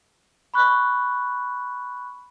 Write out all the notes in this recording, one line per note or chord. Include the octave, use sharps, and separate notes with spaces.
B5 C#6 F#6